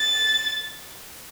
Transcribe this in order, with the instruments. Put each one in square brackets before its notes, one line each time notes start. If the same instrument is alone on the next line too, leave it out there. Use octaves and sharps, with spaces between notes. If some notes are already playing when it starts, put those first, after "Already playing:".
Already playing: [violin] A6